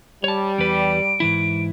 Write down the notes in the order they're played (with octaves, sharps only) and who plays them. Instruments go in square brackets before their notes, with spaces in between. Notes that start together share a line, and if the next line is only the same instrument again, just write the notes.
[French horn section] G3 [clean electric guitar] C#5 A5
[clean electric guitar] E2 B4 [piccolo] D7
[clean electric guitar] G#2 E3 E4